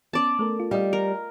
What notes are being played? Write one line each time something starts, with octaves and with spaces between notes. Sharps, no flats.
B3 C#4 D5 A5
A3 A4 A#4
F4
G3 D#5 F5
A#4